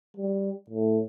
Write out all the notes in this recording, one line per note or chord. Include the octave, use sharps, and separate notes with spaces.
G3
A2